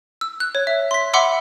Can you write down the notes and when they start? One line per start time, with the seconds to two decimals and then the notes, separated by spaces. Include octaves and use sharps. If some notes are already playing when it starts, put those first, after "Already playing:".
0.21 E6
0.40 F#6
0.55 C#5
0.67 E5
0.91 C6 B6
1.13 E5 F#5 B5 C6 D6 E6